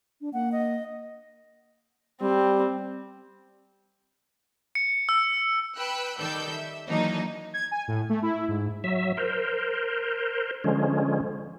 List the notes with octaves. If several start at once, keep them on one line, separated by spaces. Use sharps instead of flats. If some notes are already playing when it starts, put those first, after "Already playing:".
D4
A#3 F#5
D#5
G3 C4
C#7
E6
B4 G5 B5 E6 F#6
D#3 G3 A4 D5 E6 G6
E5
D#3 E3 F#3 A#3 D4 D#4
G#6
G#5
A2
A3
E4
G#2
F#3 E5
A#4 C5
D3 F3 G#3 C#4